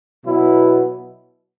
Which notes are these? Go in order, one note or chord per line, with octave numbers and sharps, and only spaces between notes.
B2 F#3 B3 E4